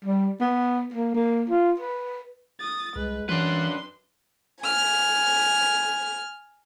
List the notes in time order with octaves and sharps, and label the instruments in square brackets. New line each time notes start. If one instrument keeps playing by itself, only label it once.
[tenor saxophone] G3
B3
A#3
A#3
F4
B4
[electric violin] D#6 A6
[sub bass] C2 [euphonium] G#3 [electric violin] B4
[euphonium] F#2 [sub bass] E3 [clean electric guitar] D4 B4 [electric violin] C6
[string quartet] G#5 F6